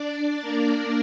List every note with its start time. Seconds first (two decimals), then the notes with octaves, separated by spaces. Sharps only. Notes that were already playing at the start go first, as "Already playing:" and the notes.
Already playing: D4 D5
0.41 A#3 A#4